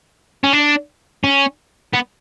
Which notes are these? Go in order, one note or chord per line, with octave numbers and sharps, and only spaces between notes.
C#4
D4
C#4
B3